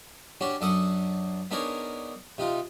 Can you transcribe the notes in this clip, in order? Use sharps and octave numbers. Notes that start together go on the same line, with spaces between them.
C#4 D4 F#4 G4
F#2 D4 A4 F#5 D#6
B3 D4 D#4 G#4 A#4 C#5
C3 D#4 F4